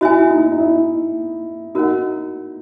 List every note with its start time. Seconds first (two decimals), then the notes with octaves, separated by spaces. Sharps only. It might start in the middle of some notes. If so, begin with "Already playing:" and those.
0.01 E4 F#4 C#5 E5 G#5
0.30 D#4
0.51 D#4
0.59 E4
1.75 D#4 F#4 A#4 C#5 F#5